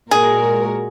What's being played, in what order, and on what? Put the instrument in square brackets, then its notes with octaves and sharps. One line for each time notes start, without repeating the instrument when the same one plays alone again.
[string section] A#2 G#3 F#4 A#4 [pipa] G#4